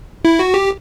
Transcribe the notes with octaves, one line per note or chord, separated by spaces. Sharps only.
E4
F#4
G4